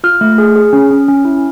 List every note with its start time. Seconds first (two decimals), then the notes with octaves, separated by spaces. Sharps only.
0.04 F4 F6
0.21 A3
0.38 G#4
0.56 G#4
0.73 C#4
0.91 C#4
1.08 C#4
1.25 E4